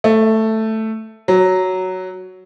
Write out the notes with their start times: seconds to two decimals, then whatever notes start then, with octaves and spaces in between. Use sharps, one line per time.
0.04 A3
1.28 F#3